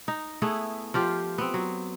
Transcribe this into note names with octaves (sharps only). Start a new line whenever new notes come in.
D#4
A3 B3 E4 G#4
F3 F4 G4
B3 C4
F#3